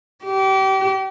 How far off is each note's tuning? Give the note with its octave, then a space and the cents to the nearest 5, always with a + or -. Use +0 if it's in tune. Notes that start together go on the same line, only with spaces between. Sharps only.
G4 -30